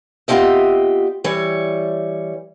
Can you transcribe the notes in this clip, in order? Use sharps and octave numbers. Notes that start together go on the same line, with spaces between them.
B3 C4 F4 G4 D#5 E5
E3 G3 C#5